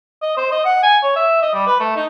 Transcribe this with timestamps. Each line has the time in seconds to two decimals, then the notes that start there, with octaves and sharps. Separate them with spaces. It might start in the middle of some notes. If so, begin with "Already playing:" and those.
0.22 D#5
0.37 C5
0.51 D#5
0.65 F#5
0.83 G#5
1.02 C#5
1.16 E5
1.42 D#5
1.54 G3
1.67 B4
1.80 A3
1.96 D#4